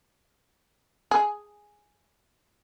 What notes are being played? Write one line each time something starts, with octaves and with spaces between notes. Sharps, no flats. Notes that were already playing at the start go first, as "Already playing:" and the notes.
G#4